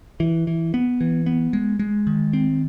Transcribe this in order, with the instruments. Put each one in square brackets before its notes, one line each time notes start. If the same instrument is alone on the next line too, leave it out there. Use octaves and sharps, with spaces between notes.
[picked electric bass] E3
E3
B3
E3
B3
G#3
G#3
D#3
C4